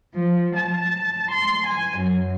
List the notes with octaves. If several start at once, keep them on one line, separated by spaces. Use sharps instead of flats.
F3
A5
C6
G#5
F#2